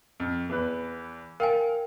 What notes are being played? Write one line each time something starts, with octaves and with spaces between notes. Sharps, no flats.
F2
E2 B4
A#4 F5 G5 G#5